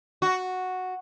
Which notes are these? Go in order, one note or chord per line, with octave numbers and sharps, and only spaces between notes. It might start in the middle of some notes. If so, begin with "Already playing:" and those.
F#4